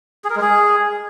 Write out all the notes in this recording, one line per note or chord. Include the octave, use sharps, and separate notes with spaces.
G#4
A#4
G#3
G#4